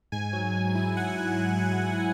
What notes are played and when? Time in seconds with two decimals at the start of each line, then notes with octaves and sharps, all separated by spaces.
0.12 G#2 G#5
0.33 F#3
0.54 F#3
0.75 E4
0.97 E4 F#5
1.18 E4
1.39 F#3